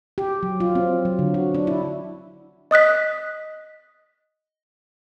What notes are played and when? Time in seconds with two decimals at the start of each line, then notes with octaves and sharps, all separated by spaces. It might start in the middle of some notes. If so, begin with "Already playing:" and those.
0.18 G4
0.43 F#3
0.60 F4
0.75 C4
1.05 F#3
1.19 D3
1.34 F#4
1.55 D4
1.67 E4
2.71 D#5 D#6 F#6 B6